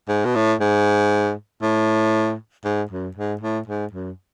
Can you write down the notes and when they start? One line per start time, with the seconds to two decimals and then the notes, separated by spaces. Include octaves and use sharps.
0.09 G#2
0.25 B2
0.35 A2
0.61 G#2
1.62 A2
2.65 G#2
2.91 F#2
3.17 G#2
3.41 A2
3.68 G#2
3.93 F#2